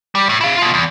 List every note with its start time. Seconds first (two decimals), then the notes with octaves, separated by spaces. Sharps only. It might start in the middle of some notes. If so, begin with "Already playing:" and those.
0.15 G3
0.29 A2
0.41 E4 F5
0.57 B2 F4
0.74 E2